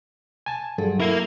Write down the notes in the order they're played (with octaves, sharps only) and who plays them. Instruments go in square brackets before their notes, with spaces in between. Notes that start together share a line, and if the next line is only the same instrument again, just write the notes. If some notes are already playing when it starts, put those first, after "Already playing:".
[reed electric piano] G#5 A5
[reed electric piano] G2 [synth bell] F#3 G#4 A4
[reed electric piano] E4 [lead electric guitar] A#4 F5